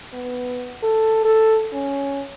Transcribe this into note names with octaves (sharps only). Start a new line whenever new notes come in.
B3
A4
A4
C#4